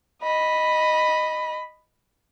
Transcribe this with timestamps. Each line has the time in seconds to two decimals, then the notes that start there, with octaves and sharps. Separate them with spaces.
0.23 D#5 B5